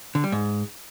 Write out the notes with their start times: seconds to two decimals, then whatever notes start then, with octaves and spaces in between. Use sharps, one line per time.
0.15 D3
0.24 G3
0.32 G#2